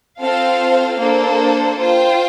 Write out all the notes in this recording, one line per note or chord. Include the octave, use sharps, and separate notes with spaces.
C4 F4 A4 C5 F5
A#3 D4 A4 C5
F4 C5 G5